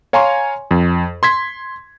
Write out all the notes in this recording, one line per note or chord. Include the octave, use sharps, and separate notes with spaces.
C#5 F5 G#5 A#5 C6 C#6
F2
C6 G#6 B6